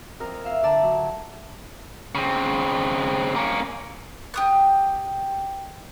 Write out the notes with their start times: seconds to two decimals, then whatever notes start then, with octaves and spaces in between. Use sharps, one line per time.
0.20 F2 A#4 F6
0.45 E5 F5
0.63 D3 D5 A5 A#5
0.83 F#3
2.15 C#3 C4
3.36 A#3 C#4
4.34 G4 D#6 F#6